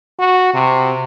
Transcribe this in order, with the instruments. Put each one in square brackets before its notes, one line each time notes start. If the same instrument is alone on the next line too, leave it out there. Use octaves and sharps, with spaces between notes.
[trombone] F#4
C3